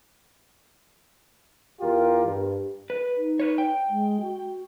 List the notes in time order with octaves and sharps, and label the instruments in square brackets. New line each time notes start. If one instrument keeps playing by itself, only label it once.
[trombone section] E2 F4 G4 A#4
G2
[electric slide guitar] B4
[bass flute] D#4
[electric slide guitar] B4 C#5
G5
[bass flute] G#3
F#4